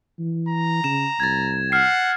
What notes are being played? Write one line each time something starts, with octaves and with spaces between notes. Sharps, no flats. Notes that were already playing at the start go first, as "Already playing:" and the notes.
E3
A#5
C#3 E7
C2 G#6 A6
F#5 F6 C7